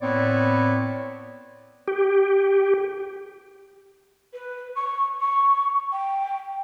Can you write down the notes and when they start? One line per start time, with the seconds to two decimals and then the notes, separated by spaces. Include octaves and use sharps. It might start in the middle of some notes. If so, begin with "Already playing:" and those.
0.02 A2 B3 C4 E4 C#5 D5
1.88 G4
4.33 B4
4.75 C#6
5.20 C#6
5.92 G5